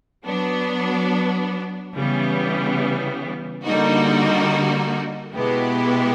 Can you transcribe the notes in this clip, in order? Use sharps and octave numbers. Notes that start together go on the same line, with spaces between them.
F#3 B3 D4
C#3 E3 G3 B3
D3 G3 A#3 D#4 F#4
B2 G#3 B3 E4 G4